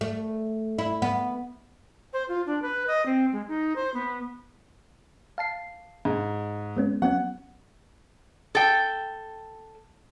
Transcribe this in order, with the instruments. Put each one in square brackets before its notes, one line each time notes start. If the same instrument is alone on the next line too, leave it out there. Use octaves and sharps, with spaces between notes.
[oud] A3
E4
B3
[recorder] C5
F4
D4
B4
D#5
C4
G#3
D#4
C5
B3
[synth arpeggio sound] F5 A5 C7
[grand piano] G#2
[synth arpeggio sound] G#3 B3 C#4
[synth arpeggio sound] F#3 B3 C#4 [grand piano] F#5
[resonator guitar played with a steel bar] A4 G5